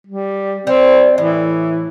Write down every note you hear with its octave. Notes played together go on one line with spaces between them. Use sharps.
G3
G3 C4
A2 E3